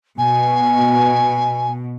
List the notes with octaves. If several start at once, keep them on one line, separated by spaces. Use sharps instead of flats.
B2 G#5